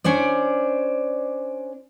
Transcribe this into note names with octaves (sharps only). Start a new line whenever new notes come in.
C#4 D4 C5 D5